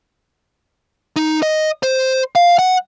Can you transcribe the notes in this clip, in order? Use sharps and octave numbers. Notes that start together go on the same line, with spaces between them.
D#4
D#5
C5
F5
F#5